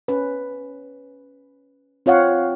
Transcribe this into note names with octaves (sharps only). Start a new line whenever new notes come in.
C#4 B4
C4 F4 C#5 F5 F#5